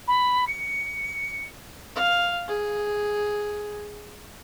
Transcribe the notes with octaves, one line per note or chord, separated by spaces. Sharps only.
B5
C#7
F5
G#4